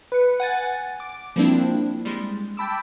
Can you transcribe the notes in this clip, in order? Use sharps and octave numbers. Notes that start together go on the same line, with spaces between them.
B4 C#7
F#5 G#5 A6
D6
F3 G3 A#3 C4 D4 E4
G3 G#3
G5 A5 B5 D6 E6